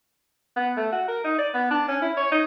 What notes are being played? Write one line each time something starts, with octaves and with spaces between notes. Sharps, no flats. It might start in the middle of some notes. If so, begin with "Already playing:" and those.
B3
A3
F#4
A#4
D#4
D5
B3
D4
C#4
E4
C#5
D#4